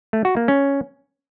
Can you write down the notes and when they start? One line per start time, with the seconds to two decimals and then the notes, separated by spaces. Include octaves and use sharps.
0.13 A3
0.25 F#4
0.37 A#3
0.48 C#4